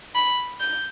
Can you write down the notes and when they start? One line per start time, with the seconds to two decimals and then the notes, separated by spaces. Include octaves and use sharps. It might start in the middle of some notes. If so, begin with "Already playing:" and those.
0.15 B5
0.60 G6